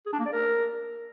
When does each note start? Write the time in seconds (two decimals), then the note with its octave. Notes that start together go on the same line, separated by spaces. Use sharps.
0.06 G#4
0.13 D4
0.19 A#3
0.26 D5
0.32 A#4